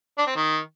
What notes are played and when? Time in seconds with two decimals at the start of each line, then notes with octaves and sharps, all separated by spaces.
0.18 D4
0.27 C4
0.36 D#3